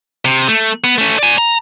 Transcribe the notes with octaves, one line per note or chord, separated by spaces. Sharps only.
C3
A3
B3
A3 C#4
D5 G#5
A#5